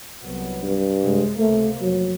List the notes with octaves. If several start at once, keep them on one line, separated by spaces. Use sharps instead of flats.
C2 F#3 B3
G2
F#2 C3 G#3
C#2 C3 A3 A#3
F1 F#3